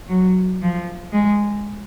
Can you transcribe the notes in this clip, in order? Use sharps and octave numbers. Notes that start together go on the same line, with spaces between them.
F#3
F3
G#3